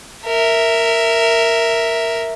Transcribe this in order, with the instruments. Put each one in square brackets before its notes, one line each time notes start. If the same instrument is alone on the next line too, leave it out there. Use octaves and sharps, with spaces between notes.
[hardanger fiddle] A#4 E5